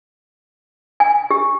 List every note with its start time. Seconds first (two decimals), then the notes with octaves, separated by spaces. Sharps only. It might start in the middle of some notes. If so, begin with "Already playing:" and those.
1.00 G#5
1.31 G4